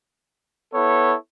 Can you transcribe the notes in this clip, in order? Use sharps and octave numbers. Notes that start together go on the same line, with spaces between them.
B3 E4 A4 C#5